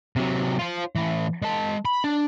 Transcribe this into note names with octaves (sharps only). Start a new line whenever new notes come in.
C3 F#3
F4 C5
A2 E3
G#3 A5
B5
D4